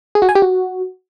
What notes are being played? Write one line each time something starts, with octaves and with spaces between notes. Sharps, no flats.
G#4
F#4
G#5
G4
F#4